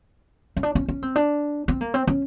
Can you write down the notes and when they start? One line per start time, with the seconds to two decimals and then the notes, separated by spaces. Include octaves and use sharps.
0.57 C#4
0.63 D4
0.75 C#4
0.88 C#4
1.02 C4
1.16 D4
1.68 C4
1.81 A#3
1.94 C4
2.07 C#4